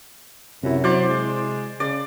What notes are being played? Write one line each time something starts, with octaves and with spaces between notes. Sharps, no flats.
F#2 C3 E4
F#3 C5 D5
G#3
C#3 D5